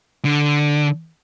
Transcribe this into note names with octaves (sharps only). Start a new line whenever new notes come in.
D3